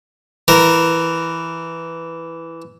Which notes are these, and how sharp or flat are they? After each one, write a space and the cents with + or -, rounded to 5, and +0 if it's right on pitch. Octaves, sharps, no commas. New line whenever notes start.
E3 +5 A#4 +0